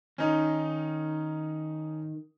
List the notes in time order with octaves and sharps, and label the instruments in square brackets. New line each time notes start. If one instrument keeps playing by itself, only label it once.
[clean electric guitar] D#3 [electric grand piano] C#4 D#4